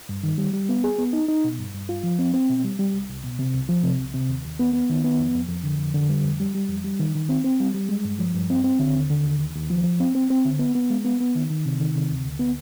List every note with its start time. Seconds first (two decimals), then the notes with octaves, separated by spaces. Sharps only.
0.09 G2
0.23 D#3
0.38 G3
0.53 G3
0.69 B3
0.84 G#4
0.98 B3
1.13 D#4
1.28 D#4
1.44 B2
1.59 G2
1.74 G2
1.89 F4
2.03 F3
2.19 C4
2.34 C4
2.49 B2
2.64 G3
2.79 G3
2.94 C2
3.09 C2
3.24 B2
3.39 C3
3.53 C2
3.69 F3
3.83 C3
3.99 C2
4.14 C3
4.29 D#2
4.44 D#2
4.59 B3
4.73 B3
4.89 D#3
5.04 B3
5.20 F2
5.34 F2
5.49 F2
5.64 D3
5.79 F2
5.94 D3
6.09 G3
6.24 F2
6.40 G3
6.55 G3
6.69 F2
6.84 G3
6.99 D#3
7.15 D#3
7.29 C4
7.44 C4
7.60 G3
7.74 G3
7.89 G#3
8.05 G2
8.19 F3
8.34 G2
8.50 C4
8.64 C4
8.79 D3
8.95 D#2
9.10 D3
9.24 D#2
9.39 D#2
9.55 D#2
9.70 F3
9.84 F3
10.00 C4
10.15 C4
10.30 C4
10.45 D3
10.59 B3
10.75 B3
10.90 G#3
11.05 B3
11.20 B3
11.35 D#3
11.50 D#3
11.66 C3
11.79 D#3
11.95 C3
12.10 D2
12.26 D2
12.39 B3